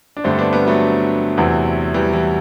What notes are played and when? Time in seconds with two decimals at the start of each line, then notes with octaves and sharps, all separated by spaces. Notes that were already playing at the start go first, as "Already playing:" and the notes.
0.17 D4
0.24 G2 D3 A3 C4
0.39 B3 D4
0.53 G3 B3
0.67 F#3 A3
1.37 E2 C3 E3
1.94 E3 G3
2.13 E3